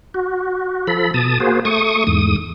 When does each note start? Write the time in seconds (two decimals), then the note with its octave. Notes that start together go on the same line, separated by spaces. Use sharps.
0.14 F#4
0.87 F3 A4 B5
1.14 B2 A5 D#6
1.40 A#3 F#4 G#4 C5
1.65 A3 C#6 D#6
2.07 E2 G#2 D#6